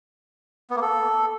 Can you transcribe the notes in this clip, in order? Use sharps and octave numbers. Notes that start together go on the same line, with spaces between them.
B3
A#3
A4